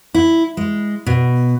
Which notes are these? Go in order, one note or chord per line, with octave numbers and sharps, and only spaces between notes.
E4
G#3
B2